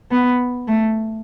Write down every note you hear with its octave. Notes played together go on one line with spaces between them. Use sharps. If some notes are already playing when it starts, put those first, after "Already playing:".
B3
A3